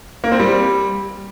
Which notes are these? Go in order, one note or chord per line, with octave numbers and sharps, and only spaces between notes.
A#3
C4
G3